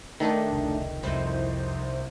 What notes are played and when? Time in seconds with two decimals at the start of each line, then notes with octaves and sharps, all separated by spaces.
0.20 D#3 A3 D4 D#4
0.50 F1 C#2
1.03 C2 F2 G3 D#4 E4 C5